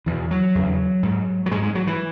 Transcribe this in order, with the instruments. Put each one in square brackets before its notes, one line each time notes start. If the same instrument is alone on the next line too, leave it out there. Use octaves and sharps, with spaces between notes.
[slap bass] E2 B2 E3
F#3
E2 C#3
G#2
F#3
G#2 G#3
G#3
F#3
E3